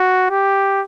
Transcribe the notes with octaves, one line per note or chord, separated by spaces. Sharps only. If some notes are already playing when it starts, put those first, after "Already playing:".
Already playing: F#4
G4